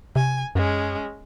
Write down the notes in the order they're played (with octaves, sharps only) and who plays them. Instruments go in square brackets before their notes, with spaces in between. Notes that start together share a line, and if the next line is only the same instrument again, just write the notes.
[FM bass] C3 [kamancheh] G#5
[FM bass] F#2 [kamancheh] G#3 C#4